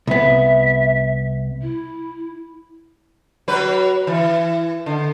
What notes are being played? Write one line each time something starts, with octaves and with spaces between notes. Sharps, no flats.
C2 B3 E5
E4
F#3 B4
E3
D3